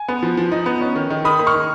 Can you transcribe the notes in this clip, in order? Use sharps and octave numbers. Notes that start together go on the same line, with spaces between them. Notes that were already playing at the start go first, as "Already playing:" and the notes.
Already playing: G#5
B3
F3
F3
D#4
B3
C#4
D#3
D#3
D#3 B5 D#6
A#3
C#6 F6
D#3